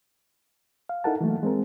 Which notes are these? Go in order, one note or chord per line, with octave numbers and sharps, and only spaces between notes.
F5
D#4 E4 A4 A#4 F#5 A5
E3 F#3 A3 A#3
G#3 C4 A#4